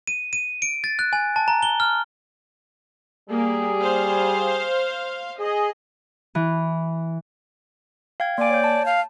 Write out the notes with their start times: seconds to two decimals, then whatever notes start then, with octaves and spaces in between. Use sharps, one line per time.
0.07 D#7
0.33 D#7
0.62 D7
0.84 A6
0.99 F#6
1.13 G#5
1.36 A5
1.48 A#5
1.63 G7
1.80 F6
3.30 G3 A#3 G4 G#4
3.80 C5 F5
5.40 G#4 D#5
6.35 E3
8.20 F5 G5 G#6
8.38 A#3 D5 G#5
8.50 C#5 G6
8.64 A5
8.86 F5